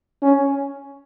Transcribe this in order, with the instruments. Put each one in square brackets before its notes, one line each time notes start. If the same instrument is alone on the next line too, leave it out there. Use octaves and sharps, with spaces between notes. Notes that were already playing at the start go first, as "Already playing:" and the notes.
[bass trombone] C#4